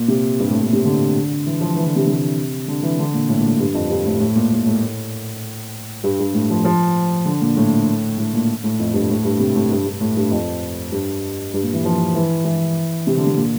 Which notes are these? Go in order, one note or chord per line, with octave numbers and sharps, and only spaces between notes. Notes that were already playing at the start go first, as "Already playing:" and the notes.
Already playing: A#2
C3
G2
A2
A#2
C3
D3
E3
F3
E3
D3
C3
C3
D3
E3
D3
A#2
A2
A#2
A2
G2
F2
G2
A2
A2
A#2
A2
A2
A2
G2
G2
A2
F3
F3
D3
A#2
A2
A2
A#2
A2
F2
G2
A2
G2
C3
A2
G2
G2
A2
G2
F2
G2
G2
A#2
E3
F3
E3
E3
C3
D3
C3
A#2